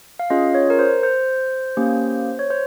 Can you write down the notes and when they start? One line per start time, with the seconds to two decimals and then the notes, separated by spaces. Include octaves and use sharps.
0.19 F5
0.30 C#4 F4 G#4 D#5
0.55 C#5
0.70 A#4
0.79 C5
1.03 C5
1.77 A#3 C#4 G4
2.39 C#5
2.50 C5